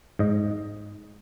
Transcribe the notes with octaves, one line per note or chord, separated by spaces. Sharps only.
G#2 D#5